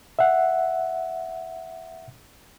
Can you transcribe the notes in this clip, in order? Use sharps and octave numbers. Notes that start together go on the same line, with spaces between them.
E5 F#5